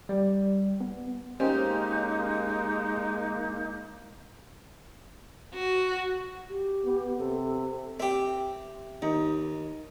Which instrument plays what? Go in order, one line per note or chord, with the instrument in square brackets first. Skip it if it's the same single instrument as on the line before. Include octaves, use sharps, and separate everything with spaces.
[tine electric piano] G3
B3
[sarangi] G#3 [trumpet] A#3 [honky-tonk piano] C#4 G4 C5 [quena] D#4
[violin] F#4
[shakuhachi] G4
[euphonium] B3
[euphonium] C3 [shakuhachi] A4
[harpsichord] C4 G4 [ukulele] E5 G5
[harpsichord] D#2 [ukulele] D#4